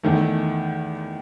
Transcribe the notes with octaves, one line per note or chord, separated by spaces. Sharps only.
E2 D#3 A3